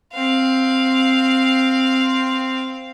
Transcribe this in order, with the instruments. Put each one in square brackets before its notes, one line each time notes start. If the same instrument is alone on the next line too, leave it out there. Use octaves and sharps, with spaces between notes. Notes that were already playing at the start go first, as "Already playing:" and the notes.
[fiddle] C4 F5